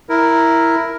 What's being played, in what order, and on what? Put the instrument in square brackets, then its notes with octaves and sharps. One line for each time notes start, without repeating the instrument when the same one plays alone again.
[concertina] E4 A#4